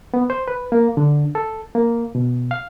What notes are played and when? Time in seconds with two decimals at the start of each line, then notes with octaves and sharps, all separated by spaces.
0.14 B3
0.30 C5
0.48 B4
0.72 A#3
0.97 D3
1.35 A4
1.75 A#3
2.15 B2
2.51 F5